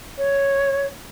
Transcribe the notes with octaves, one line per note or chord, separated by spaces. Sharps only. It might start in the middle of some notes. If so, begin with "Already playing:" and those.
C#5